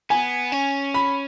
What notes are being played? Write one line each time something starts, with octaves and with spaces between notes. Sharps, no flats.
B3 G#5
C#4
B5